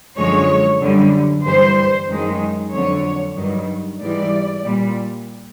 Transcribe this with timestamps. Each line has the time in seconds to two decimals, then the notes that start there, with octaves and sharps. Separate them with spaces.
0.17 F#2 D3 F3 G#3 C#5
0.80 F#2 D3 G3
1.44 G2 E3 G3 C5
2.08 F#2 D#3 G#3
2.72 F2 D3 F#3 C#5
3.36 G2 D#3 F#3
4.00 G#2 E3 G3 D5
4.64 A#2 G3